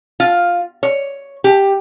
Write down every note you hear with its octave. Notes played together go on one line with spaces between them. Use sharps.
F4
C#5
G4